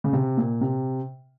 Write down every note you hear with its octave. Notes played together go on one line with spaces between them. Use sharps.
C#3
C3
A#2
C3